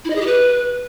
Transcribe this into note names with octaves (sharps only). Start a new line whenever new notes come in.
E4
D#5
G#4
G4
B4